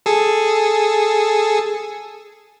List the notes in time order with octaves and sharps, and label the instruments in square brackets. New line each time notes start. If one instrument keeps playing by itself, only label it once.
[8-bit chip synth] G#4 A4